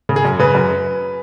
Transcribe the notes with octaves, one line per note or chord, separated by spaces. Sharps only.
C#3
G#4
F#2
C#3 B4
F#2